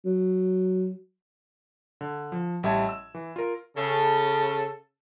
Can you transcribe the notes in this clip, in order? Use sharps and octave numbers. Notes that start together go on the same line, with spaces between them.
F#3
D3
F3
A1 G3 E5 A5 G#6
E6
E3
F4 A#4
C#3 A4